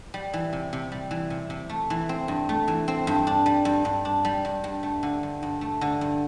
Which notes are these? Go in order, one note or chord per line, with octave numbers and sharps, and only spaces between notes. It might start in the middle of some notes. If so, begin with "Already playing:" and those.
G3
E3
C3
C3
G3
E3
C3
C3
A3
E3
C4
G2
A3
E3
C4
G2
D4
G3
G2
G2
D4
G3
G2
G2
A3
D3
G2
G2
A3
D3
G2